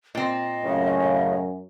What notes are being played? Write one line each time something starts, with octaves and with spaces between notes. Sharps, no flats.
A#2 C4 D#5
F#2 A2 C#3